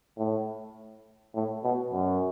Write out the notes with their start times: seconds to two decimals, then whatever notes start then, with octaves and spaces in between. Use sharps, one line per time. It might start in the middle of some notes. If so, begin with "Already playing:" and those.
0.17 A2
1.34 A2
1.63 B2
1.93 F#2